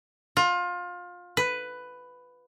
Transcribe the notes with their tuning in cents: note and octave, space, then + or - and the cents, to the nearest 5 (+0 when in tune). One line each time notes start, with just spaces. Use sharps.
F4 +25
B4 +10